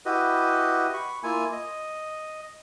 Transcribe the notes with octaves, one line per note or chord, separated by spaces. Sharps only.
E4 F#4 G4 B4 D#5
B5 C#6
A#3 E4 F4 G#5
D#5